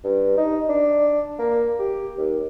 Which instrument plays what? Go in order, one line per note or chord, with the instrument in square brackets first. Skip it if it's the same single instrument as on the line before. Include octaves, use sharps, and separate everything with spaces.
[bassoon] G2
D#4
D4
A#3
G4
D#2